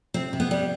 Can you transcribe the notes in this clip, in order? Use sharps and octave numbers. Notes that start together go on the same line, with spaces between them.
C3 C4
C3
B3
G3